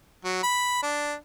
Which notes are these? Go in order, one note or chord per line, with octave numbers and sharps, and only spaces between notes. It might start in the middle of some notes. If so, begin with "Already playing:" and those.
F#3
B5
D4